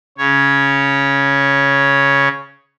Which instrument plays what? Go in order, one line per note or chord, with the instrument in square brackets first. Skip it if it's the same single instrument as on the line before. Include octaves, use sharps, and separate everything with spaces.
[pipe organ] C#3 C#5